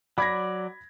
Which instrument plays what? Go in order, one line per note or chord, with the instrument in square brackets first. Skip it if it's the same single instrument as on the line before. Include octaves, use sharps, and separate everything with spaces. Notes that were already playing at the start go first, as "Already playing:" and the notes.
[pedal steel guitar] F#3 D5 [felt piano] B5 G#6 A#6